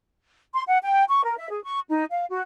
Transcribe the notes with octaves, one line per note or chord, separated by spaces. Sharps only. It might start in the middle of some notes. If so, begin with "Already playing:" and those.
C6
F#5
G5
C#6
A#4
E5
G#4
C#6
D#4
F5
F#4